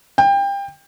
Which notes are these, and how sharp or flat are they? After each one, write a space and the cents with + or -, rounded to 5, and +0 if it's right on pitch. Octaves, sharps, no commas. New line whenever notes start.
G5 +25